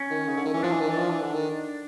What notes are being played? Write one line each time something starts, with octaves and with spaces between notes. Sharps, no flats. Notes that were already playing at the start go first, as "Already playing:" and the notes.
Already playing: C#4
D#3
C#3
D3
D#3
E3
F3 D4
E3
D#3
E3
F3
E3
D3
D#3